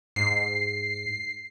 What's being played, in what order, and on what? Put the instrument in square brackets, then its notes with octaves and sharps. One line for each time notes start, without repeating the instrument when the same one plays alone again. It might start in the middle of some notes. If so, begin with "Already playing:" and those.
[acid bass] G#2 [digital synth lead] C7